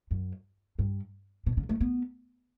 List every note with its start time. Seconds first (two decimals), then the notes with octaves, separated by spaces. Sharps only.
0.11 F#2
0.79 G2
1.46 B2
1.57 C#3
1.69 A3
1.81 B3